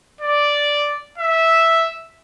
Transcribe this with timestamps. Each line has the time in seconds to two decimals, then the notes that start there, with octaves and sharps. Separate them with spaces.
0.20 D5
1.18 E5